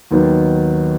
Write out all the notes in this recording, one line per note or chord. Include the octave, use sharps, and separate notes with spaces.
D#2 D#3 F#3 B3